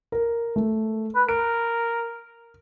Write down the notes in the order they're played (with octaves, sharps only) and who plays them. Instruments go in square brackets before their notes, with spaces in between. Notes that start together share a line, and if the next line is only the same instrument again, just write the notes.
[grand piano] A#4
A3
[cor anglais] B4
[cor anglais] A#4 [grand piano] D7